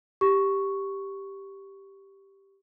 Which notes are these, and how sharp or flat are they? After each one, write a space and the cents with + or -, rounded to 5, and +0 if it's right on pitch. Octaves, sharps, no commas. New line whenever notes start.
G4 +0 C#6 +0